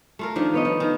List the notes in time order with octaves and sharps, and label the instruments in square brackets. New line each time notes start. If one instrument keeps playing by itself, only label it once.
[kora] A3 F4 A#4
[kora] D#3 F3 [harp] D4
[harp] B3 C#5 D#5
[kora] F3
D#3